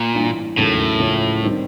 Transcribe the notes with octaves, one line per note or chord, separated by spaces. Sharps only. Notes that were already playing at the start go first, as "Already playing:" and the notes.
Already playing: A#2
A1 G2 E3
E1 D#2 A2 C#3 F#3 A3
C#2 C#3 F3 A3 C#4
G2 D#3 G3 C4 D#4